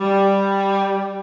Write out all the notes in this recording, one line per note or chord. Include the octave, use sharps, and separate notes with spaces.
G3